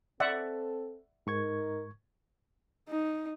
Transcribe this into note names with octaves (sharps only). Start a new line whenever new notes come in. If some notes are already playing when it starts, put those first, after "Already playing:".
C4 A4 D5 E5 F#5
G#2 D#4 A#4 C#6 G#6
D#4